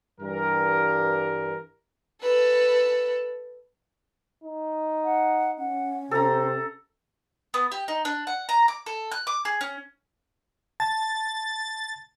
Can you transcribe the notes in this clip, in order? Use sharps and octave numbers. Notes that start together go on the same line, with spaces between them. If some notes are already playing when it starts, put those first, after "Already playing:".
G2 E3 G3 A#4
A4 B4
D#4
F#5
C#4 F#5
C3 A4 C5 A#5
B3
G4
D#4
D4
F#5
A#5
D6
A4
F#6
D6
G#4
C#4
A5 A6